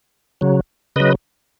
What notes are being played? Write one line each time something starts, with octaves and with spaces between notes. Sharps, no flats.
C#3 F#3
C#3 F#3 B4 D#5